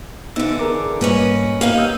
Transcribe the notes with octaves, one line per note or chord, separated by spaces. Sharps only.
D3 E3 B3 D#4 E6
G#4 A#4 D6
G#2 G3 A#3 C#4 B4 D#5
A#3 B3 D#4 G4 F5 F6
D#6 E6 G6